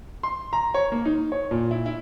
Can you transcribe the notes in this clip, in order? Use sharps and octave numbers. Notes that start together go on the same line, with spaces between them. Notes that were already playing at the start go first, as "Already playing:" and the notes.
C6
A#5
C#5
A#3
D#4
C#5
A#2
E4
E4